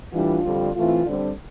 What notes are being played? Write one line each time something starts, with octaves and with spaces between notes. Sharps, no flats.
A2 E3 G3 D4 F4
F2 D3 G3 C4
A2 E3 A3 C4 F4
D3 G3 C4